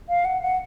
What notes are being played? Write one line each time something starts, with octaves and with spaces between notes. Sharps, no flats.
F5
F#5
F#5